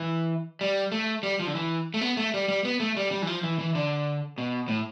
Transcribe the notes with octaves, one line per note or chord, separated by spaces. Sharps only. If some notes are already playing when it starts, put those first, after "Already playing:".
Already playing: E3
G3
A3
G3
F3
D3
E3
A3
B3
A3
G3
G3
B3
A3
G3
G3
E3
F3
E3
E3
D3
B2
A2